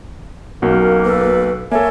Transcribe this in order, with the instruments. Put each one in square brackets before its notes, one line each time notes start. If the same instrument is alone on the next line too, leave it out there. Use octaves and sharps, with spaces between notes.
[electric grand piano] B1 C#4 F#4 [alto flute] A#3 [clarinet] A#4
[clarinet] A4 [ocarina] B4
[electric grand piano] A#3 A4 [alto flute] C#5 [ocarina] E5 [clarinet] G#5